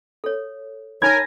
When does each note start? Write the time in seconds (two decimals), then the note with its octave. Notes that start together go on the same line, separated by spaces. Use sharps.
0.24 A4 C#5
1.02 D#4 A#4 C#5 G#5 B5 G#6 A#6